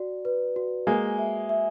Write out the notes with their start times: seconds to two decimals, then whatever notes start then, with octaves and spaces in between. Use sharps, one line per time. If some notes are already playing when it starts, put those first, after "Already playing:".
Already playing: F#4 D5
0.25 B4
0.56 F#4
0.87 G#3 A#3 G#5
1.18 E5
1.49 E5